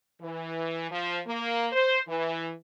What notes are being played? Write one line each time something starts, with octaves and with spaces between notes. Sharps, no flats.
E3
F3
A#3
C5
E3